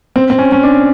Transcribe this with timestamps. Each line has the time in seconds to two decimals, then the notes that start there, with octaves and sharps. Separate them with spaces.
0.16 C4
0.30 C4
0.39 C#4
0.52 C#4
0.63 D4